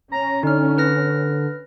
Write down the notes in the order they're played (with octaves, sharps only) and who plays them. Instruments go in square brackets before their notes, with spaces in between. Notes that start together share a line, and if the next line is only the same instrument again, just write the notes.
[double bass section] C#4 [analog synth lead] A#5
[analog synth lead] D3 [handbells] D#4 F6
[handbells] B4 F6 A#6